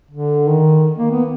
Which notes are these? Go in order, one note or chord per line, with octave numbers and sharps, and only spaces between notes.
D3
D#3
A#3
B3